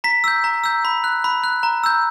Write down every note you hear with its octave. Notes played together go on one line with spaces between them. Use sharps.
A#5 B6
E6 G6
A#5
E6 G6
B5
F#6
B5
F#6
A#5
E6 G6